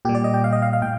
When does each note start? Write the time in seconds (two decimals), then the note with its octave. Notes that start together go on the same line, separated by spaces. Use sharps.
0.05 A#2 G4
0.09 G3
0.15 D5
0.24 D#5
0.34 G5
0.44 F5
0.53 D#5
0.62 F5
0.73 F5
0.82 A2 G5